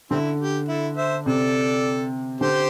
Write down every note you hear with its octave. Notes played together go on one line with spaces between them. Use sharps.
D3 G3 C4 E4
G4
E4 A4
C5 E5
C3 A4 D5
D3 G4 C5